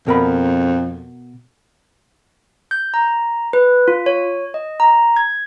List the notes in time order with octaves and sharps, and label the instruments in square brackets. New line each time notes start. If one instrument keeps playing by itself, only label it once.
[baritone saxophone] F2 [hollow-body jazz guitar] B2 A#4 B5
[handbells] G6
A#5
B4
F4
C#5
D#5
A#5
G#6